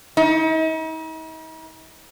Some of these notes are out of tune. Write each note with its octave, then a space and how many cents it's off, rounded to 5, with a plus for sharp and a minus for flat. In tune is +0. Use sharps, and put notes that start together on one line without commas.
D#4 +45